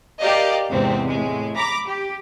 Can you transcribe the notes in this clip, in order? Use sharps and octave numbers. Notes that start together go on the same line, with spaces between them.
G4 A#4 D5 D#5 F5
E2 G#2 C3 C4
A2 G#3
A#5 B5 D6 A#6
G4